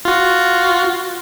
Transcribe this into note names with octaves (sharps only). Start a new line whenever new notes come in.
F4 F#4